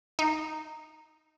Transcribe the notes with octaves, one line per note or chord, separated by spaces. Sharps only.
D#4